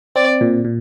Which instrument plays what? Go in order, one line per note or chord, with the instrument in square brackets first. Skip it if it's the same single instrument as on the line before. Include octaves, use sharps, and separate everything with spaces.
[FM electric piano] C4 [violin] D5
[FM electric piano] A#2
A#2